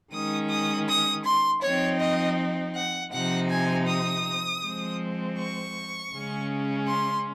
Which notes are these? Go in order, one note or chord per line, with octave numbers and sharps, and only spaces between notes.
D#3 G#3 C#4 D#6
D#6
D#6
C6
F3 C4 D#4 C#5
D#5
F#5
C3 F3 C4 D#4 F#5
G#5
D#6
F3 G#3 C4
C#6
C#3 G#3 C#4
C6